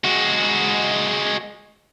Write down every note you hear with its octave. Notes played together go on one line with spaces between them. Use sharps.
G#3 F#4